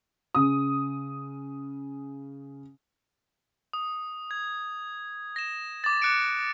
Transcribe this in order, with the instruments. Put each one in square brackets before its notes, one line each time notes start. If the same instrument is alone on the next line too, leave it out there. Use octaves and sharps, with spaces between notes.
[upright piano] C#3 D#6
[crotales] D#6
G#6
A#6 E7
D6 A6
D6 F#6 C#7 D7